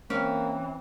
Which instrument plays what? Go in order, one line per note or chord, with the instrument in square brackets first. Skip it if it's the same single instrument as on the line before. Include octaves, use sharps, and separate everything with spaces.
[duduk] E3 [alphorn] A#3 [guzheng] C4 [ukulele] C#4